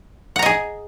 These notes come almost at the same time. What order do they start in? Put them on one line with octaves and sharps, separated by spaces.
F#5 A#5 D#5 G#4